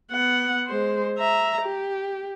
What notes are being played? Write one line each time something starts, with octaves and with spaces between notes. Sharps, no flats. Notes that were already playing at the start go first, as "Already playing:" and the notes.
B3 F#5
G#3 C5
E5 A#5
G4